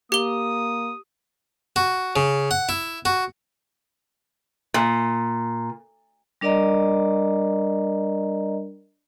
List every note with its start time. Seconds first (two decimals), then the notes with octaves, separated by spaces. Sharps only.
0.12 A#3 G4 D#6 G7
1.76 F#4
2.16 C#3
2.51 F#5
2.69 E4
3.05 F#4
4.74 A#2
6.41 G3 D4 A#4 D5 D#5 A#5